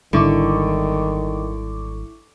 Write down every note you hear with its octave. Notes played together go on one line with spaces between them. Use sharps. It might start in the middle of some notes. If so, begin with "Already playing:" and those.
G#1 G#2 D3 D#3 G3 E4 C#6 D6